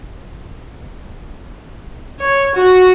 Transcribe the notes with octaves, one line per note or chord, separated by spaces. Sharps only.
C#5
F#4